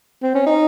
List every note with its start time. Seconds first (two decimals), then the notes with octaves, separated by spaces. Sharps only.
0.23 C4
0.35 C#4
0.47 D#4